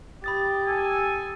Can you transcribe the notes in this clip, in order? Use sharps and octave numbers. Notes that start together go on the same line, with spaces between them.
G4 B5 D#6 A6
A4 G#5